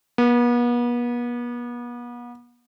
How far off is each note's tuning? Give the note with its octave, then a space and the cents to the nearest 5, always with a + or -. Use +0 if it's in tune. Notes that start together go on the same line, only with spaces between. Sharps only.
B3 -40